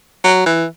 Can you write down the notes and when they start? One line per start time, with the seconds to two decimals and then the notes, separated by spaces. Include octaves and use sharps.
0.24 F#3
0.46 E3